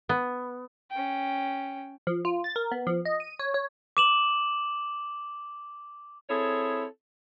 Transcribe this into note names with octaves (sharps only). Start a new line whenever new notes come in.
B3
C#4 G5
F3
F4
A6
A#4
B3
F3
D#5
D#7
C#5
C#5
D6 E7 F#7
C4 E4 G#4 A4 C#5